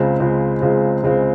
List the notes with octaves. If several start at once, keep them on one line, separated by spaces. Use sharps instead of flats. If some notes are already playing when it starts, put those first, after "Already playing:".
Already playing: C#2 C#3 G#3 C4
C#2 C#3 G#3 C4
C#2 C#3 G#3 C4
C#2 C#3 G#3 C4